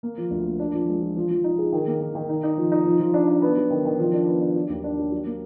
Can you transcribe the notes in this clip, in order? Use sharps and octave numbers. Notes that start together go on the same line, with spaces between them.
A#3
F3
D2
A#3
D4
F3
G#3
F3
F3
F3
D#4
G#4
D#3
A#3
D#3
D#3
D#4
D#4
F3
D#4
F3
F3
D4
D4
B3
F#3
D#3
D#3
F3
D4
B3
D4
F#3
D#2
D4
F#3
F#3
A#3